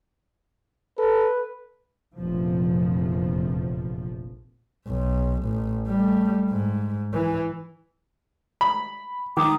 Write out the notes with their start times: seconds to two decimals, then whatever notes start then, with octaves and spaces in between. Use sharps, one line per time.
0.98 A4 B4
2.17 F1 A#1 E2 F3
4.87 B1
5.44 A1
5.88 G3 A3
6.50 G#2
7.13 E3
8.61 B5
9.37 D#3 D6 D#6